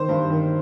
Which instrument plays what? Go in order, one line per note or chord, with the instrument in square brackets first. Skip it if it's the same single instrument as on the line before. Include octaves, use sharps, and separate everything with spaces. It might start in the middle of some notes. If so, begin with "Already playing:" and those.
Already playing: [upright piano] D#3 C5
G2
D#3